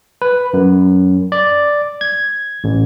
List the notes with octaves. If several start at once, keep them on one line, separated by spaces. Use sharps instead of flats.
B4
F#2
D5
G#6
A1